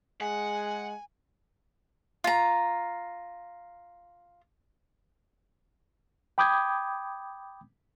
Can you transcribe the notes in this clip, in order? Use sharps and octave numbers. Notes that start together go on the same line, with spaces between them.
G#3 G#4 F#5 G#5
F4 A#5
G5 B5 D6 D#6 G6 G#6